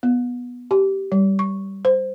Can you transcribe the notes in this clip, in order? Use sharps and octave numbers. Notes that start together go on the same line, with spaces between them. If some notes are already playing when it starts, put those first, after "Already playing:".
B3
G4
G3
C#6
C5